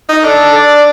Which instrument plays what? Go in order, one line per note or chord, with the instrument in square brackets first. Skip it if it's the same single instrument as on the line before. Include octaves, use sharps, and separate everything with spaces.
[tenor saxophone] D#4
[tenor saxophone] D4 [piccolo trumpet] A4
[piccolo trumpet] D5